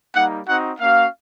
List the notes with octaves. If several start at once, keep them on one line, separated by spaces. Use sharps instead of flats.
G3 A#3 D#4 F#5
C4 D#4 F#4 F#5
A#3 C#4 F#4 F5